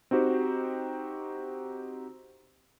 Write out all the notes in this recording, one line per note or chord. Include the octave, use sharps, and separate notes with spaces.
C4 D#4 F#4 G4 C5